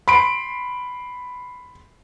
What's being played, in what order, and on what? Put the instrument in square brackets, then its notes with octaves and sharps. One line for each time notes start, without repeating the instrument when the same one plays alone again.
[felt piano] B5 C6 D7